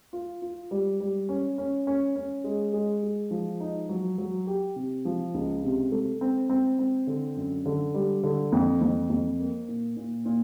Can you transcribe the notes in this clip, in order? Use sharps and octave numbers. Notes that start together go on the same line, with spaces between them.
F4
F4
G3
G3
C#4
C#4
C#4
C#4
G#3
G#3
G#3
F3
D#4
F#3
F#3
G4
C3
F3
C#2
C3
A3
C4
C4
C4
D3
F#2
D3
G3
D3
F2
F2
F2
A#3
A#2
A#2
A#2